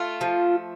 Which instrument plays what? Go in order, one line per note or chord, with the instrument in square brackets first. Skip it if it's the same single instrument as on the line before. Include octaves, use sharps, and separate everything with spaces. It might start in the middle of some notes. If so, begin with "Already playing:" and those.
Already playing: [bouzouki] A3 F4
F3